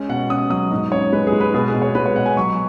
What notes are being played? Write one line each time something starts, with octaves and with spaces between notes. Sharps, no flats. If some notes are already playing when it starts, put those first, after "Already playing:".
Already playing: G#3 C#4
B2 F#5
C#4 D#6
F#3 D#6
G#2 D#5
C#4 C#5
G#3 B4
G#4
G#3
B4
B2 G#4
G#4
B2
C#5
G#3 B4
C#5
B2 F#5
G#5
F#3 C#6